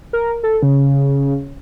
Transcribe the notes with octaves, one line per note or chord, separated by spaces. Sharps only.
A#4
A4
C#3